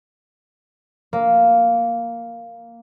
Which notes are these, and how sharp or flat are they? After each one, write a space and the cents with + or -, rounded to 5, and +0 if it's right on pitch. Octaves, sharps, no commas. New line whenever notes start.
A#3 -5